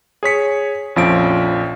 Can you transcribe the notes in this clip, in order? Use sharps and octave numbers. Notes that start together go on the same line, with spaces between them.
G#4 C#5 B6 C#7
A#1 F2 F3 C#4 D7